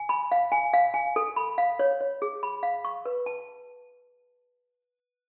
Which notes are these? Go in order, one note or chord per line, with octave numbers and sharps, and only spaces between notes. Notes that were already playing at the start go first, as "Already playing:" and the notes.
Already playing: G#5
B5
F5
G#5
F5
G#5
A4
B5
F5
C#5
C#5
G#4
B5
F5
C#6
B4
A5